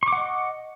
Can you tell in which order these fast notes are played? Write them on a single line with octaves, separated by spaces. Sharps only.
C#6 D6 F#5 D#5